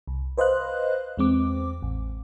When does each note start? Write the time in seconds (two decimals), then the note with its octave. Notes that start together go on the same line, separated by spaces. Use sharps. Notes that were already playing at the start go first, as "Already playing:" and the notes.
0.07 C2
0.38 B4 C5 D#5 F5 F#6
1.17 E2 G#3 C4 D6
1.82 A1